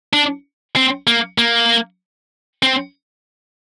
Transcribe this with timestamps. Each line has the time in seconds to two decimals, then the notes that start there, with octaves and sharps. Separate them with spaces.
0.13 D4
0.76 C4
1.07 A#3
1.38 A#3
2.63 C4